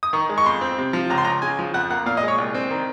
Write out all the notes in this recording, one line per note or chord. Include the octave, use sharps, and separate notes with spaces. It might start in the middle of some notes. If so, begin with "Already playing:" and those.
D#6
D#3 C#6
G#3
C#6
F2 C6
C4
C3
F3
C#2 A#5
C6
C#2 A#5
C#3 G#5
F3
F2 F#5
A#3 F#5
A#2 F5
D#5
G#3
C#5
C2
C4
D#3